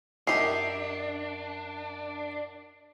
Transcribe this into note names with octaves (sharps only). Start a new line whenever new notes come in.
F#2 D4 D#4 G4 E5 C7